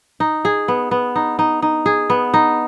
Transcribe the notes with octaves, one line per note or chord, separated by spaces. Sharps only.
D#4
G#4
B3
B3
D#4
D#4
D#4
G#4
B3
D#4